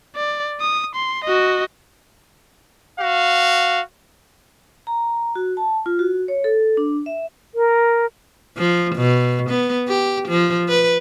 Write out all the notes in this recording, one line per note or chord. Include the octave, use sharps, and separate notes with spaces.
D5
D#6
C6
F#4 D#5
F#4 F5
A#5
F#4
A5
F4
F#4
C#5
A4
D4
E5
A#4
F3
B2
B3
G4
F3
B4